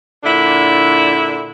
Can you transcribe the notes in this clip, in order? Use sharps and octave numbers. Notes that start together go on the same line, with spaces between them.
A#2 D3 D4 E4